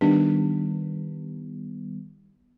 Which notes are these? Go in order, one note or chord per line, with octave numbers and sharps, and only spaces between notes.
D#3 G3 B3 D4